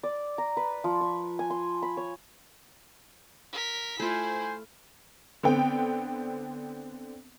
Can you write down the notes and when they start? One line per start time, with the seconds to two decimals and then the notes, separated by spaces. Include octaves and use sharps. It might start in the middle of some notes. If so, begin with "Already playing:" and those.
0.03 D5
0.38 A#5
0.57 B4
0.84 F3
1.01 C#6
1.39 G#5
1.50 C6
1.82 B5
1.97 C#5
3.52 A#4 B6
3.99 A3 E4 F4 C5 G#5
5.43 D3 B3 C4 G5